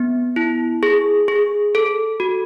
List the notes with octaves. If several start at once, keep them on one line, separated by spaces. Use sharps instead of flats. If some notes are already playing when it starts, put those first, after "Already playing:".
Already playing: B3
E4
G#4
G#4
A4
F#4